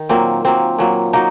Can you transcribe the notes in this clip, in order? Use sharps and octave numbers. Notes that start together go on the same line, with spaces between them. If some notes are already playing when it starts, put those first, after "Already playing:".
Already playing: D#3
A#2 F#3 A#3 C4
A#2 F#3 A#3 C4
A#2 F#3 A#3
F#3 A#3 D#4